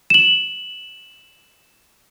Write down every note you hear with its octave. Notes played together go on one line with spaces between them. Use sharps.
E7 F#7